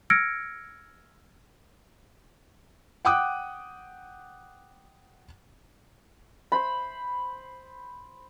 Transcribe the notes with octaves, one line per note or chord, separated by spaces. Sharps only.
E6 F6 G#6 A#6 C#7 D7
F#5 G5 D6 D#6 F#6
C5 B5